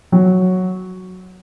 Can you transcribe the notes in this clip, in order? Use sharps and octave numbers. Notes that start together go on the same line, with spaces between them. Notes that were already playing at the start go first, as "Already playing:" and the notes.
F#3